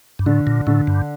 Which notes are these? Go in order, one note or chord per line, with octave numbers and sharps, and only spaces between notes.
G2
A2 D3
A#2
A2 D3
G2